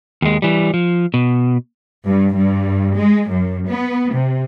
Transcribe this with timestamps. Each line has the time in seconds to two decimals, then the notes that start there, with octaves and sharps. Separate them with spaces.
0.22 D#2 G#3
0.42 E3 G3
0.74 F3
1.14 B2
2.06 G2
2.36 G2
2.97 G#3
3.30 F#2
3.67 B3
4.14 C3